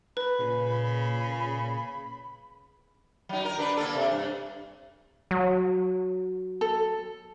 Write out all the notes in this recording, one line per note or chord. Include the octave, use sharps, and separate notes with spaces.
B4 B5
A#2 C#3
F#3 D#4
A#4
D3 D4 B4
A#3 D4 A4
C3
G2
F#3
A4